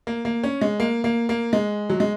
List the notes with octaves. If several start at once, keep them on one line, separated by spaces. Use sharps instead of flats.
A#3
A#3
C#4
G#3
A#3
A#3
A#3
G#3
F#3
G#3